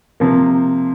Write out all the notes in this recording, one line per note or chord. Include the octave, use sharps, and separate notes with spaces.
C3 F3 A#3